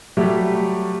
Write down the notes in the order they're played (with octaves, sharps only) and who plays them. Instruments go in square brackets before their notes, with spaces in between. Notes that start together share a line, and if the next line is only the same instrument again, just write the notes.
[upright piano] F#3 G3 A3 G4